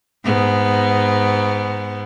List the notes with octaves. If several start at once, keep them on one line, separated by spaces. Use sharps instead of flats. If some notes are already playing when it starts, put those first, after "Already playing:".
G#2 B3